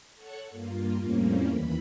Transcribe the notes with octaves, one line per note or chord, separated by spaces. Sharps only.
A4 C#5 F#5 C#6 F#6
G2 A#3 F4
F2 A2 G3 A#3 C4 C#4
D#2 E3 B5